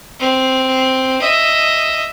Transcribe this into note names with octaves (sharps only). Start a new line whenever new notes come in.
C4
D#5 E5